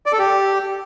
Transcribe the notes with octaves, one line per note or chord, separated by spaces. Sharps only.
D5
A4
G4